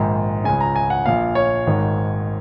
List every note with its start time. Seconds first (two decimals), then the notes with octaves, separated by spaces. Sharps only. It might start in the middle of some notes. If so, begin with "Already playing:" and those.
Already playing: A#1 G#2 D#3
0.44 C#2 C#3 G#5
0.61 A#5
0.76 G#5
0.90 F#5
1.06 A#1 A#2 F5
1.35 C#5
1.67 G#1 G#2 D#3